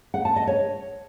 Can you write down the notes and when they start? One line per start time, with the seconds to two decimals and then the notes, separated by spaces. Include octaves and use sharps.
0.14 F#5
0.25 A5
0.36 D#5
0.47 C#5